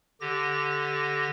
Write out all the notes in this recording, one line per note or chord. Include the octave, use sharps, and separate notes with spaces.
D3 G4 A#6